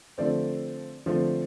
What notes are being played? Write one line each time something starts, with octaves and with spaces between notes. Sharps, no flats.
D3 F3 A3 C4 D5
D3 F3 A3 C4